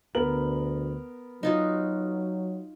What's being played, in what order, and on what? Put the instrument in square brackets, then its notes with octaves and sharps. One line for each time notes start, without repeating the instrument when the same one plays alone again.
[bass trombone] D2 [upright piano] B3 A#4 F#7
[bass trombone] F#3 [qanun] D#4 F4 F#4